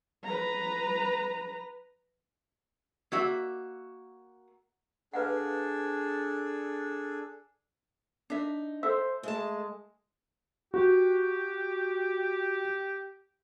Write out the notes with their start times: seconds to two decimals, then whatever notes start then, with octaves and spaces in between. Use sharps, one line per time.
0.25 B4 A#5
3.12 A#3 F#4 E5
5.14 D4 G#4 A4 B4 F5 F#5
8.30 D4 D#4 E5
8.83 A4 C5 E5 E6
9.23 G#3 A3 A5
10.74 F#4 G4